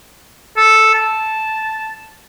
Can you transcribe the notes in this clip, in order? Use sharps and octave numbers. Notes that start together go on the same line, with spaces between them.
A4
A5